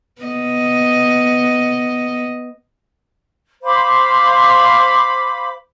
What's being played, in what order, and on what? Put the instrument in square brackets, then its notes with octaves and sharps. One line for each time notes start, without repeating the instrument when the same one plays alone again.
[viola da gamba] B3 D#5
[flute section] C5 F5 B5 D6